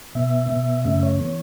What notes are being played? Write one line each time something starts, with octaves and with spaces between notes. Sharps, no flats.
B2 B3 E5
B2 B3
F#2 C#3 A3 C#4 E5
C#5
E3 B3